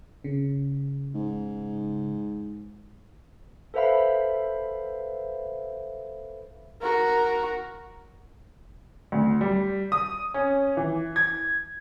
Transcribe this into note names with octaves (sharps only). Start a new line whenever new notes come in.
C#3
G#2
A4 B4 C5 E5 F5 B5
F#4 A#4
D2
G3
D#6
C#4
E3
G#6